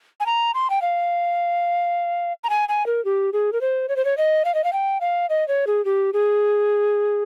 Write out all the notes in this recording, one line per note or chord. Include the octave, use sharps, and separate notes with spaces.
G#5
A#5
C6
G5
F5
A#5
G#5
G#5
A#4
G4
G#4
A#4
C5
C#5
C5
C#5
D#5
F5
D#5
F5
G5
F5
D#5
C#5
G#4
G4
G#4